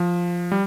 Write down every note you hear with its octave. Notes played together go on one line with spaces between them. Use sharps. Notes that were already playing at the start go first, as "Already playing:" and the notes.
Already playing: F3
G3